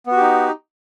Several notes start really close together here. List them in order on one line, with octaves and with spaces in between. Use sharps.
B3 F#4 G4 D#4